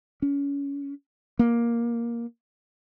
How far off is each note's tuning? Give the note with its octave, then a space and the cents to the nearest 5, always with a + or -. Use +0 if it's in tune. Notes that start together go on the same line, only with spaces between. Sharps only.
C#4 +25
A#3 +10